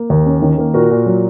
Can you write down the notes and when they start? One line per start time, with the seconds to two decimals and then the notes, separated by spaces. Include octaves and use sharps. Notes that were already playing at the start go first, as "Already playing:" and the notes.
Already playing: A#3
0.10 D#2
0.26 C#4
0.42 D#3
0.58 A#3
0.74 A#2 F#4 A#4
0.90 A#2
1.06 F#3